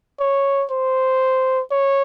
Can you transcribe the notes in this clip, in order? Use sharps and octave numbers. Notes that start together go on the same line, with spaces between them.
C#5
C5
C#5